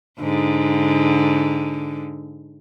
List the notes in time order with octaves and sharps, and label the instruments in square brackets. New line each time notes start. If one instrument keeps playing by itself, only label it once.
[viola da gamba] G#2 D3